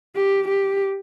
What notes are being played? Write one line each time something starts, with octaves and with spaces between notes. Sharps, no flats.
G4
G4